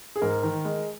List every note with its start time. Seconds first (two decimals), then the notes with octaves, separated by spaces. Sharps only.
0.16 G#4
0.22 G#2 A#4
0.43 D#3
0.65 G#3